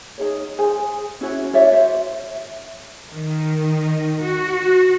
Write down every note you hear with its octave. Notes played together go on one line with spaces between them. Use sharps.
D#4 G#4 C#5
G#4 C5 G#5
C#4 E4 F#4 C#5
F#4 C#5 D5 E5
C5 E5
D#3
F#4